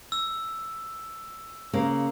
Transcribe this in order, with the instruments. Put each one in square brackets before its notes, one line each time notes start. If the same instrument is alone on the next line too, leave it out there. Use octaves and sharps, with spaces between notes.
[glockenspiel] E6
[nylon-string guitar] C#3 A#3